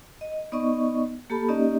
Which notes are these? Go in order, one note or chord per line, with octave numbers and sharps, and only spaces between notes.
D#5
B3 D#4 D5 D#5 C#6
A#3 G4 A4 A5 B5
A#3 C#4 D#4 G4 D5 D#5